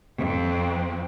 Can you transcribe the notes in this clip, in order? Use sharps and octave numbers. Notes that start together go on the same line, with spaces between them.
F2 C4